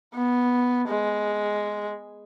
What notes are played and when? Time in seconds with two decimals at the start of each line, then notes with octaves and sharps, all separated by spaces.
0.15 B3
0.88 G#3